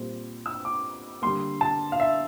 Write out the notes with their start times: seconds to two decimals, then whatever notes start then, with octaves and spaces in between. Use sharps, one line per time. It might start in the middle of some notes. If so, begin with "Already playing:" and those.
Already playing: A#2 G3 C4
0.46 E6
0.65 D6
1.22 D3 G3 A#3 C6
1.61 A5
1.92 F5
2.00 E5